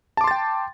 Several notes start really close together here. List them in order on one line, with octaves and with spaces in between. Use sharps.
A5 D6 C6 A6 G5